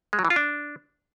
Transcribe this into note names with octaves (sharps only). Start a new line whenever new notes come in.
G#3
F#3
E3
F4
D4